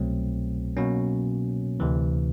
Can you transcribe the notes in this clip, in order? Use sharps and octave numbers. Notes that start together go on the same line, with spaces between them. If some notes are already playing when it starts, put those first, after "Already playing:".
Already playing: C2 B2 F#3 A3 C4
B2 F#3 A#3 C#4
D2 C3 E3